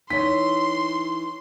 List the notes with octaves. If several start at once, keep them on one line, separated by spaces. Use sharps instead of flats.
E3 D#4 C#5 C6 B6